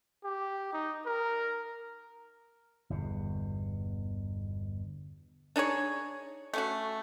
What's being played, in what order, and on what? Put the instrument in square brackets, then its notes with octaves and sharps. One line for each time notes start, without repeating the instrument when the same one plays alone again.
[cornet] G4
D#4
A#4
[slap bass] G1 E2 B2
[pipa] D4 D#4 G#4 C#5
A3 C#4 F#4